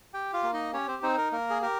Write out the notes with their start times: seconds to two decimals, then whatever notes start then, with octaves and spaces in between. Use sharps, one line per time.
0.14 G4 G5
0.33 F4 F5
0.43 A#3
0.53 D#4 D#5
0.73 C#4 G4 C#5
0.88 C4 C5
1.03 C4 D#4 C5
1.18 A#4
1.32 A#3 A#4
1.50 G#4
1.62 G4 A#4